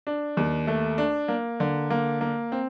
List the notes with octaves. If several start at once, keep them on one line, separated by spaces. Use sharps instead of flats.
D4
D#2
A3
D4
A#3
D3
A#3
A#3
C4